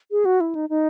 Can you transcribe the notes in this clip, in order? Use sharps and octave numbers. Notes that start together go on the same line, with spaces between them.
G#4
F#4
E4
D#4
D#4